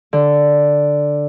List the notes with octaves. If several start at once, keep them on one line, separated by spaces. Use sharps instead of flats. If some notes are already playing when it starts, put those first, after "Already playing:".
D3